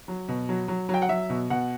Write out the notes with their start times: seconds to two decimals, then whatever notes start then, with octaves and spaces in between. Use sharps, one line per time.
0.08 F#3
0.28 B2
0.49 F#3
0.68 F#3
0.89 F#3
0.94 G5
1.02 F#5
1.09 F#3 E5
1.30 B2
1.50 B2 F#5